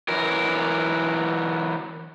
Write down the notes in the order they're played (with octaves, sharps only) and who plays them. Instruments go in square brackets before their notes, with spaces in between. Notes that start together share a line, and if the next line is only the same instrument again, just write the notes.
[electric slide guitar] E3 F#3 A#4